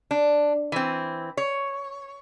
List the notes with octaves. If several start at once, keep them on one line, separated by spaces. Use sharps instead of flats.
D4
E3 C4
C#5